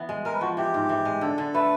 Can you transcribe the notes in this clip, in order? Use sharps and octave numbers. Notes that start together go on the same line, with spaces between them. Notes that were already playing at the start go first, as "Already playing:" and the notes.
Already playing: E3 B3
G#3
G#3 A#4
B4
F3 F#4
E3 G4
G#2
E3
G#3
D3 A4
D3
A3 B4